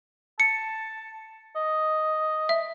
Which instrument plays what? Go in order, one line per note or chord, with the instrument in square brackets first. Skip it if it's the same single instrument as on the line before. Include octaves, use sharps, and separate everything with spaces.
[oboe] A5 [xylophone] C#7
[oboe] D#5
[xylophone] E5